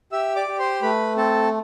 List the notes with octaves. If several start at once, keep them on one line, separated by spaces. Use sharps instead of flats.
G4 E5 E6
D5 D6
G4
C5 C6
A3 B4 B5
C4 A4 A5